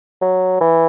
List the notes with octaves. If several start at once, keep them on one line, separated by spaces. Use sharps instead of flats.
F#3
E3